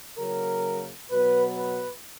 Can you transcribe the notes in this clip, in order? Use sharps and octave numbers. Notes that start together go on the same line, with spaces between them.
C#3 F#3 A#3 A#4
B2 F#3 B3 B4
B4